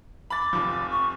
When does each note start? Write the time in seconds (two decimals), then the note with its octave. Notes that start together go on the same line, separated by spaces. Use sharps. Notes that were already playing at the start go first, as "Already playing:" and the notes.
0.30 B5 D6 A6
0.53 F1 F3
0.90 C#6